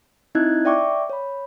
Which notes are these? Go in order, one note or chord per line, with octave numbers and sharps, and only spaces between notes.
C4 D#4 E4 D#5 F#6 G#6
D5 E5 G5 C#6 D6
C#5 B5